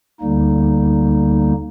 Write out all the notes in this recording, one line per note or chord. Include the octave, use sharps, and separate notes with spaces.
D2 D3 G3 A#3 D#4